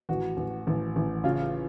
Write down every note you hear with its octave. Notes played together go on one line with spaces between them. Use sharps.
A1 F#4
A1
A1
A1
C#3 F4